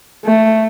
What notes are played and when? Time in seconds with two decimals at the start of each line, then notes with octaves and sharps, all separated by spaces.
0.24 A3